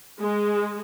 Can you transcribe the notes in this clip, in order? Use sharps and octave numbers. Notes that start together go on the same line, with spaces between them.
G#3